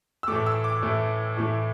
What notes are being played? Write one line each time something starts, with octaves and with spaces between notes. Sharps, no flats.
E6
A2 E3 A3 D6
E6
D6
A2 E3 A3
A2 E3 A3